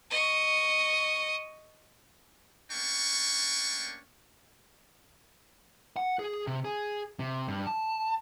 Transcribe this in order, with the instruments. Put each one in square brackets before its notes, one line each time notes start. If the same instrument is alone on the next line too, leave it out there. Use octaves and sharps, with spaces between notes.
[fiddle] D#5 C#6
[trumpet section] A3 A#3 C#4 D4 G5 C#6
[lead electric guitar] F#5
G#4
C3
G#4
C3
G2
A5